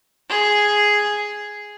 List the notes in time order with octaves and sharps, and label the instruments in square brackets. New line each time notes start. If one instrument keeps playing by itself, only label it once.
[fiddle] G#4